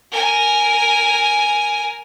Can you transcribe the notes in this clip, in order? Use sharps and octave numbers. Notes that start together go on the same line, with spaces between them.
A#4 G#5